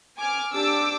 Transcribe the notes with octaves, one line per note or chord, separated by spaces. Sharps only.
G#5 D6 F6
D4 G4 A5 D6 E6